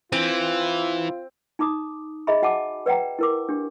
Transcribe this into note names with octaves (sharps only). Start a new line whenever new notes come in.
E3 C4 F4
D#4 A#5 D6 D#6
G#4 D#5 E5 A#5 B5
F#4 F#5 G#5 A5 D6
B4 D5 F#5 G5 A#5
E4 A#4 D6
D4 G4